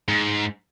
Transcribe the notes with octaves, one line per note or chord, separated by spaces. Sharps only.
G#2